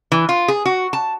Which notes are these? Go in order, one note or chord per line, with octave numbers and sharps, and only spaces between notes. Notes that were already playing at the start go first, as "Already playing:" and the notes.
E3
F4
G#4
F#4
A5